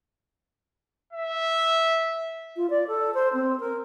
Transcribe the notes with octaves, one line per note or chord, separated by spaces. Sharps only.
E5
F4
D5
A4
C5
C4
A#4